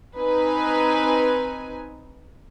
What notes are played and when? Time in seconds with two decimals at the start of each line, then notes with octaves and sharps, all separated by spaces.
0.18 C4 D#4 B4 G#5